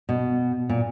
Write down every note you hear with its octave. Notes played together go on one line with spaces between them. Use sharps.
B2
A#2